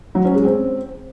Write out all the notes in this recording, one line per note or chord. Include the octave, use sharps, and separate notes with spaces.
F#3
C#4
G#3
C4